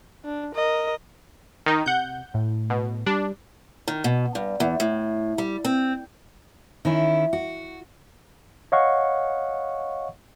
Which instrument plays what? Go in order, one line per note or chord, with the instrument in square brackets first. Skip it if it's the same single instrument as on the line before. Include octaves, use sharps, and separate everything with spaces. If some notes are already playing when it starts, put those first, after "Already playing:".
[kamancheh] D4
A#4 D#5
[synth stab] D#3 D#4
[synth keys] C3 [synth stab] F#5 G6
[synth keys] A2
[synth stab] B2
[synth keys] G3 [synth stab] D4
[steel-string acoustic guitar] D#3
B2
G2
E2
A2
G3
C4
D#3 C#4 E4
F#4
[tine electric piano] C#5 D#5 F5 F#5 C#6